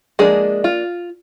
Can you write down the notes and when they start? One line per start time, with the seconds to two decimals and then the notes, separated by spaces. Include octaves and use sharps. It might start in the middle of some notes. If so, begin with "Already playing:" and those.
0.19 F3 G#3 A#3 D4 G#4
0.64 F4